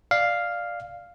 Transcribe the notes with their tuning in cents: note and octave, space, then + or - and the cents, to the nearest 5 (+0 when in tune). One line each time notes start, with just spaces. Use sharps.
D5 +10 F5 +0